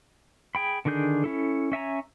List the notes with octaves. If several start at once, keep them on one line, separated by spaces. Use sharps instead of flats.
G#4 G5 B5
D3 D#3 D4 G#4 G6
C#4 E4 A4
C#4 E5 G#5 A#5